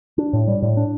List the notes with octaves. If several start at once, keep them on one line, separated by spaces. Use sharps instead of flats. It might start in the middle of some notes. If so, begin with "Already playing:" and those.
D4
A2
G3
A2
D4